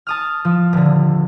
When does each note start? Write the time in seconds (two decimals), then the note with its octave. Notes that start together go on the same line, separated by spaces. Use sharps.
0.07 A5 D#6 F6
0.45 F3
0.73 D#1 D3